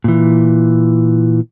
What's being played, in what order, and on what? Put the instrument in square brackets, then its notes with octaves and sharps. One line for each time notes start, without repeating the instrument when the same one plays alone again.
[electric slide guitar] A#2 E3